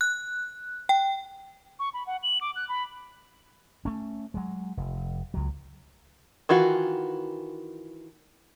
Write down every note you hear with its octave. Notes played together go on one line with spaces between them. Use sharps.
F#6
G5
C#6
B5
F#5
F#7
D6
F#6
B5
A3 C#4
F#3 G#3
F1
C#2 F#3
D#3 E3 F4 F#4